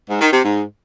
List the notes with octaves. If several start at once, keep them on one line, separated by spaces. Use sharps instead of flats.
G#2
D#3
C3
G#2